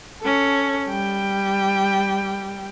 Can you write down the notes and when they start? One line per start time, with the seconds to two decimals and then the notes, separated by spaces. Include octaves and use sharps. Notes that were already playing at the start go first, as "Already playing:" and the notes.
0.22 C#4 A4
0.89 G3 G5